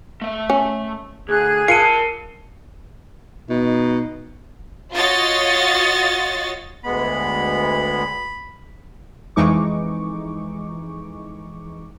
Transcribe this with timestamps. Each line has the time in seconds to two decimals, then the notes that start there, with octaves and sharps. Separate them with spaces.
0.21 A3 E5
0.50 C#4
1.29 D2 G#4 F#6 G#6
1.68 F4 A#4 A5 C7 C#7 D#7
3.49 B2 D#4
4.93 F4 F#4 C#5 D#5 A6
6.84 D2 G#3 B3 B5
9.36 F2 E3 G#3 D#4 C#6 D6